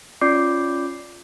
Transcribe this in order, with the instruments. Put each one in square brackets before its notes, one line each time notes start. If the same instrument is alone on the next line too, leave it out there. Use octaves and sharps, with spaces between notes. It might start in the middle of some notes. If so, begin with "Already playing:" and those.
[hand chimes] C#4 F4 D5 D6 G6 C7